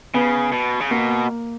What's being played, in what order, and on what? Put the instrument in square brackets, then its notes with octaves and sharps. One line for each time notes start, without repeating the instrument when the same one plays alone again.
[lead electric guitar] C#3 [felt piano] B3
[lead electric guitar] B2
C#3
[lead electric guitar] B2 [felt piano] A#3